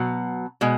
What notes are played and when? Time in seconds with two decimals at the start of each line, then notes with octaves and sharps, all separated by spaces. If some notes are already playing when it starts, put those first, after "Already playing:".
Already playing: B2 F#3
0.61 B2 G#3